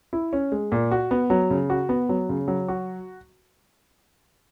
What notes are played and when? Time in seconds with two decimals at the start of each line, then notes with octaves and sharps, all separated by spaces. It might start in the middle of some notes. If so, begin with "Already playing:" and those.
0.13 E4
0.33 C#4
0.52 G#3
0.72 A#2
0.91 F#4
1.11 B3
1.30 F#3
1.50 C#3
1.70 F#4
1.89 B3
2.09 F#3
2.29 C#3
2.48 F#3
2.68 F#4